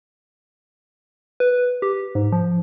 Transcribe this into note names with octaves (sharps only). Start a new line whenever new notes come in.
B4
G4
G#2
F3